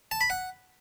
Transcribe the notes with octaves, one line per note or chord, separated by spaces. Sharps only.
A5
B5
F#5